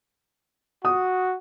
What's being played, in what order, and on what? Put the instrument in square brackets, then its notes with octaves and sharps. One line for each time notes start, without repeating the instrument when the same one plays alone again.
[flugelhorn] F#4 [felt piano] D#6